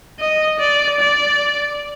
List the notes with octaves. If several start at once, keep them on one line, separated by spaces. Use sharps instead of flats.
D#5
D5
D5